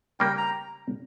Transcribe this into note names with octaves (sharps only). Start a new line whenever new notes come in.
C#3 G3 A#3 C#4 G4 G5
A#5